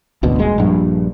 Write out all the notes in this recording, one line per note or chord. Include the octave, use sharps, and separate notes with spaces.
G#1 D2 B2
D#1 G#3
A#1 G2